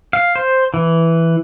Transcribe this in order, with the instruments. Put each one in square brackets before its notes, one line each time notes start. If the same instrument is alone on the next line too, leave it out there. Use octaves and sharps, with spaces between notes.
[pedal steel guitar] F5
C5
E3